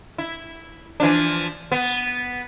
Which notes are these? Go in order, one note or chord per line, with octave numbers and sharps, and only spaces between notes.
E4
E3 F3 D4
B3